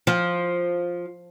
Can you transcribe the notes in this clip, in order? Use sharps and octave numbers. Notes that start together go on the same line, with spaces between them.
F3